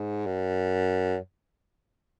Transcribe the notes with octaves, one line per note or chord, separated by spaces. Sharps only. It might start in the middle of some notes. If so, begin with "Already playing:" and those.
Already playing: G#2
F#2